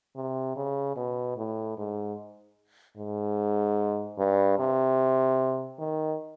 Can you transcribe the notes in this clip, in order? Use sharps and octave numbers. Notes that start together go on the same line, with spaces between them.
C3
C#3
B2
A2
G#2
G#2
G2
C3
D#3